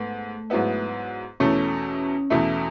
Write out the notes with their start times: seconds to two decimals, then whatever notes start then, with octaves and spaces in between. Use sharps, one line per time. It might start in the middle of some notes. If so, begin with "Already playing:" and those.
Already playing: G#2 A3 B3
0.50 G#2 F#3 B3 E4
1.40 E2 B2 A3 C#4 E4
2.30 E2 B2 A3 E4